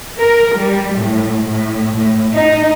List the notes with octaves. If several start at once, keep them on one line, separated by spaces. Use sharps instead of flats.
A#4
G3
A2
A2
A2
D#4